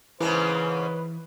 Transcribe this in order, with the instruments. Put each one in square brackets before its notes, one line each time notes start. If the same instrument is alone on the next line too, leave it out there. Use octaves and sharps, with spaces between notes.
[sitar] G#2 C#3 A#3 [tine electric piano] E3 [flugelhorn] B4